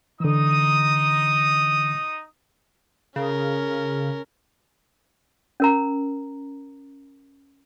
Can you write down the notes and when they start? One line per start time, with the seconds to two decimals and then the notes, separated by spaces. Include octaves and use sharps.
0.20 D3 E3 D#4 D#6
3.16 C#3 C#4 A#4
5.60 C#4 A#4 A#5